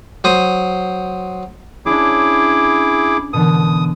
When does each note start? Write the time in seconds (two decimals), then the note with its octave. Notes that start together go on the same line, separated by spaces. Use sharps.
0.24 F#3 C5 D#6
1.86 C#4 D4 E4 G#4 D6
3.33 B2 D3 E3 D#6